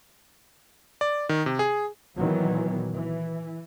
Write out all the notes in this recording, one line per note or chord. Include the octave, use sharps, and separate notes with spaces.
D5
D#3
C3
G#4
A#2 D#3 E3 F#3 B3
E3